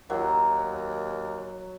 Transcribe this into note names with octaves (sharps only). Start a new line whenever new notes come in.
D#2 F#3